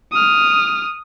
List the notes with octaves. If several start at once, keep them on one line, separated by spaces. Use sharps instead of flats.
D#6 F6